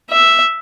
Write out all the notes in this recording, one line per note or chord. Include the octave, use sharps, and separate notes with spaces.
E5